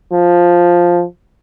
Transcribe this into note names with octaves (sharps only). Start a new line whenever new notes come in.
F3